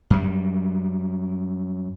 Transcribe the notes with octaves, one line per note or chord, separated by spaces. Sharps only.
F#2 G3